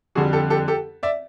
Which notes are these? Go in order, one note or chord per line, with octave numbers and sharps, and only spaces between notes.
F2 D3 G3 F#4 G#4
G4 A4
G4 A4
G4 A4
D5 E5